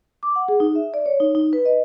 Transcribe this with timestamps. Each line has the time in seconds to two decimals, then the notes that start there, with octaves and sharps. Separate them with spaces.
0.23 D6
0.36 F#5
0.48 G#4
0.60 D#4
0.75 E5
0.94 D5
1.06 C#5
1.20 D#4
1.35 D#4
1.53 B4
1.65 D#5